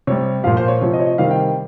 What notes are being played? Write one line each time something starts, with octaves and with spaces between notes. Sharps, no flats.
C3 G3 C#5
A#2 F3 F5
C5
C#5
C3 F3 C#5
D#5
C#5
D#5
C3 D#3 G3 F5
G5
G5